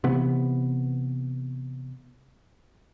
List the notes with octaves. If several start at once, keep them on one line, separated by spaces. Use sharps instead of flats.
C3 E3 B3